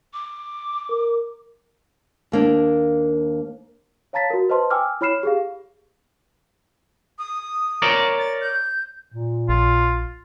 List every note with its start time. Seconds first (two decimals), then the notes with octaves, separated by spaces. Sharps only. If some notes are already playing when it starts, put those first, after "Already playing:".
0.13 D6
0.90 A#4
2.32 D#2 A#3 D4
4.13 C#5 F5 A5 A#5 A6 B6
4.30 F#4 A#4
4.49 B4 C5 D#5 A5 C6
4.70 G5 G#5 D6 E6 F6
5.01 E4 C#5 B5 F6 C7 E7
5.23 G4 G#4 F5
7.18 D#6
7.82 A#4 C#5 D5
8.19 A6
8.41 G6
9.13 A#2
9.49 A#1 F4